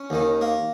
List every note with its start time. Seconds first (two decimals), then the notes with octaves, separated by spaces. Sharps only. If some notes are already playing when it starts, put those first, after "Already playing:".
Already playing: C#4
0.10 D#2 D#3
0.41 A#3